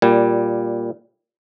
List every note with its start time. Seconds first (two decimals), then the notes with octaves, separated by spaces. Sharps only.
0.02 A#2 G3